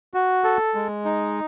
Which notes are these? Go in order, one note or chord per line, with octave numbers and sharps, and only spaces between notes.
F#4
A4
G#3
D#4